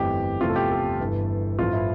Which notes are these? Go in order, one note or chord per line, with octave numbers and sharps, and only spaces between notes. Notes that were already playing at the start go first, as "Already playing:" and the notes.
Already playing: G1 F2 E3 A3 G4
E2 C3 F3 A3 F4
A4
G4
A4
G1 G2 E3
A1 G2 F3 A3 F4
E4